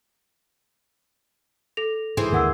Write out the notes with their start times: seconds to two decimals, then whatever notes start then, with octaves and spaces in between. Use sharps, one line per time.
1.77 A4 A#6 F7
2.17 G#2 E3 G#4 C5
2.32 D#2 G#2 D3 A#4 F#5 E6